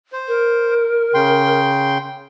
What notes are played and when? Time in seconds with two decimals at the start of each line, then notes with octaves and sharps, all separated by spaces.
0.12 C5
0.28 A#4
1.14 C#3 G5 C6